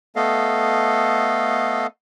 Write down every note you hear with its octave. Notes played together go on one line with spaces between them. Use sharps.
A3 B3 A4 D#5 F5